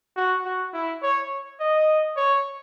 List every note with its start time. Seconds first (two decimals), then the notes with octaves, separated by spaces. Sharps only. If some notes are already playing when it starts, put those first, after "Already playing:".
0.17 F#4
0.45 F#4
0.73 E4
1.03 C#5
1.60 D#5
2.17 C#5